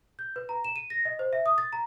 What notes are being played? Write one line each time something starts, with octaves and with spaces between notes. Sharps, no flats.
G6
B4
A#5
E7
D#7
A#6
D#5
C5
E5
D#6
A6
A#5